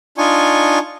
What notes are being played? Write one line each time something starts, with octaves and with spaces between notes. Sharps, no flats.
D4 D#4 F4 G#5 C#6